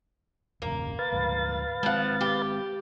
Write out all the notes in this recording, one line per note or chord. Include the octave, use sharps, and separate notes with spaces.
E1 A1 C#3 A#3
B4 F5 A6
D2 G#2
F3 G#3 C4 F#5
G4